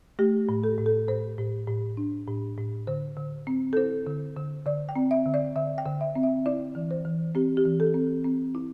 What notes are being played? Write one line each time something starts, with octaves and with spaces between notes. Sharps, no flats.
A3 G4
A2
A4
A2
A4
A2 C5
A2
A2
D4
A2
A2
D3 C5
D3
C4
A4
E4 C5
D3
D3
D3 D5
G5
C4
E5
D3
D5
D3 E5
G5
D3
E5
C4
E5
E4 D5
E3
C5
E3
C4 G4
G4
E3
A4
C4
C4
E4